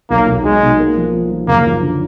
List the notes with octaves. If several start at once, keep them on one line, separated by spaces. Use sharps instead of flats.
B1 A#3
B1
G#3 D#4
B2
A#3
F3
F3
F3
F#1 A#3
F3
D3